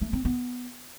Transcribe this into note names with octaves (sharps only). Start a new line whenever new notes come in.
A3
C4
B3